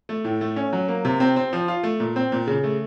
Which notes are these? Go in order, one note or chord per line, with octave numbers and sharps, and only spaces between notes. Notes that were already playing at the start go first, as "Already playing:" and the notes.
A3
A2
A3
C#4
F#3
A#3
C3
C4
C4
F3
F4
A3
A#2
C4
A#2
C#3
A3